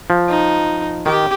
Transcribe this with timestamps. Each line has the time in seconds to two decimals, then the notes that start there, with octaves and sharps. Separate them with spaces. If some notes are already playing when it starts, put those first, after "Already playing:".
0.10 F3
0.29 D#4
1.06 D#3 G4